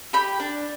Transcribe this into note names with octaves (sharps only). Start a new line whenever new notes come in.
G4 B5
D4